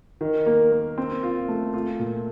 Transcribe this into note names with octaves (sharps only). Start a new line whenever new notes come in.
D#3
A#3
A#3
C4
F4
A3
F4
A#2